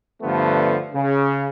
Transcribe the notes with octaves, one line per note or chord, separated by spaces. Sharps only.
G2 D3 F3 A3 B3
C#3